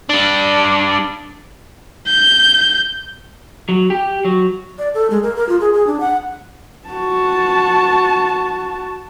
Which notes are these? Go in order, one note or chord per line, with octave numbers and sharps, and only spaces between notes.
G3 D4
G6
F#3
G4
F#3
D5
A4
G#3
A#4
A#4
F4
G#4
G#4
D4
F#5
F#4 A5